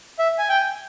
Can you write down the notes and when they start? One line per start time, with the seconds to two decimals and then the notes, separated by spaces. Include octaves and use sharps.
0.19 E5
0.38 G#5
0.49 G5